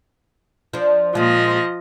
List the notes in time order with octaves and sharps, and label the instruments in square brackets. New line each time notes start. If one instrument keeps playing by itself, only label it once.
[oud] F3 D4
[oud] A#2 G#3 [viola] F3 D#5